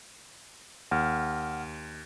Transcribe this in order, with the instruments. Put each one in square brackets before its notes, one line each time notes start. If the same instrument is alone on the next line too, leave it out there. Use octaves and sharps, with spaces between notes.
[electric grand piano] D#2 [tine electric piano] F#5 F6